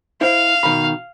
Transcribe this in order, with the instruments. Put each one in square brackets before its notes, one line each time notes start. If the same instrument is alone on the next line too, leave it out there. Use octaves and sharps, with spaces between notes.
[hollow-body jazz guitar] E4 C5 [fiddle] F5
[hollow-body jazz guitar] B2 D#3 B5